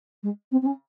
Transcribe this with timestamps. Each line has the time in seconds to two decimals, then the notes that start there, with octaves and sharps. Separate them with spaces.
0.23 G#3
0.51 C4
0.62 C4
0.65 C#4